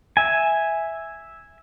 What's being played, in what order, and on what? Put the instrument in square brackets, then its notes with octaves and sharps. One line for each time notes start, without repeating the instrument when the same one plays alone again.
[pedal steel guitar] E5 G#5